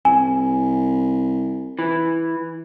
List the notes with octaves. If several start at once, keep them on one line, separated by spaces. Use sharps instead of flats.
C2 G#5
E3